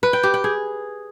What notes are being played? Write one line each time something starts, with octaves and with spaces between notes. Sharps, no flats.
B4
G5
G4
G5
G#4